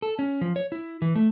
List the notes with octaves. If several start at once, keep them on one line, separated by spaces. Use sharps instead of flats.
A4
C#4
F3
C#5
E4
E3
A3